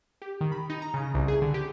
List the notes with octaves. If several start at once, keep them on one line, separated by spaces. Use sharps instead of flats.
G4
D#3
B5
D#4
A#5
C#3
C2
G#4
D3
G4